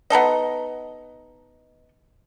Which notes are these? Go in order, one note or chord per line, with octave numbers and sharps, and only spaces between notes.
B3 D#4 A4 D#5